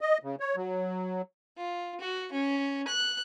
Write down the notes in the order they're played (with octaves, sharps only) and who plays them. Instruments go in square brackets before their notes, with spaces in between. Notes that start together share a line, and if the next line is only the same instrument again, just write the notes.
[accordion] D#5
C#3
C#5
F#3
[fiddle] F4
F#4
C#4
F#6